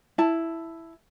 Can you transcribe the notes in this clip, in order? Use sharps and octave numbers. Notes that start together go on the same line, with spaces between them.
E4 A5